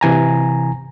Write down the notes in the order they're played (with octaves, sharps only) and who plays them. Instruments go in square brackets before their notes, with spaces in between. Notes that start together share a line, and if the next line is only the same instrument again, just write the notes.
[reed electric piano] C3 E3 G#5 A#5